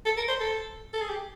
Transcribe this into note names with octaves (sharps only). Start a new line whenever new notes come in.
A4
A#4
C5
A4
A4
G#4
G4